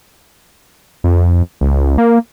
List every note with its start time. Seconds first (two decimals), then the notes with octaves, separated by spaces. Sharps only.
1.04 F2
1.61 C#2
1.98 A#3